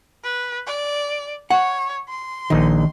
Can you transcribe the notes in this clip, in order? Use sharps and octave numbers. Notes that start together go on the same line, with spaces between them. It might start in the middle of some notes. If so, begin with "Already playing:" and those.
B4
D5
C#5 F#5
C6
A#1 D#3 D#4